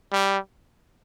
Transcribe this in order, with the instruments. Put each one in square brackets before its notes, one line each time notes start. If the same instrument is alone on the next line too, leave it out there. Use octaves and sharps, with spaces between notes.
[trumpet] G3